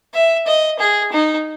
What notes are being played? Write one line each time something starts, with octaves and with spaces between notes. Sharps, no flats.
E5
D#5
G#4
D#4